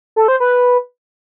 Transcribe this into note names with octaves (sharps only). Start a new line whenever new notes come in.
A4
C5
B4